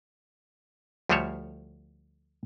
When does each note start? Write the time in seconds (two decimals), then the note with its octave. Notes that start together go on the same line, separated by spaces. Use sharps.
1.09 D2 F3 G3 A3 C5 C#5